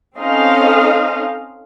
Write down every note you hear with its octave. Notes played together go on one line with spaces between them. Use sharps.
C4 C#4 D#4 A4 D#5 F5